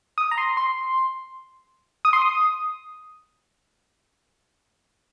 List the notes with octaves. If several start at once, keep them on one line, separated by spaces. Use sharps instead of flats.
D#6
A#5
C6
C6
D#6
C6
D#6